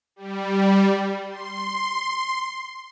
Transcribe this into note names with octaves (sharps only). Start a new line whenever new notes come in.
G3
C6